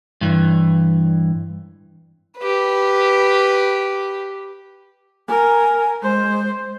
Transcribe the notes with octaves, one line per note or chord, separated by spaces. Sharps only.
G2 E3
G4 B4
A#4 G#5
G#3 C5